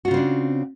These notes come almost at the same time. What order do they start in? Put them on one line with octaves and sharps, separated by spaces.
F#4 F4 C#3 C4 D4